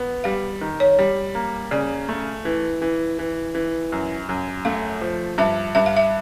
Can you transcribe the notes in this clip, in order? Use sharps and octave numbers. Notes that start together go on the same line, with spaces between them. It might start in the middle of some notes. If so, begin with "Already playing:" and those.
Already playing: B3
G3 F5
D#3
C#5
G3
A#3
C#3 D5
A3
E3
E3
E3
E3
F#2
F#2
A3 F5
F3
G2 E5
G2 E5
F5
E5